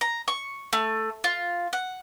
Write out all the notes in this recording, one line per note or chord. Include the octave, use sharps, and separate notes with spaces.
A#5
C#6
A3
F4
F#5